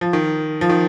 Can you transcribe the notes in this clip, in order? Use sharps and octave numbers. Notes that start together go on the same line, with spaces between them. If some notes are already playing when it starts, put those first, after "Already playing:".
F3
D#3
F3
D#3